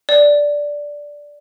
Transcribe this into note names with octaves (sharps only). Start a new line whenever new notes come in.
D5